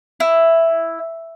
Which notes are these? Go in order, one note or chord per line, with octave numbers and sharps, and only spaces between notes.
E4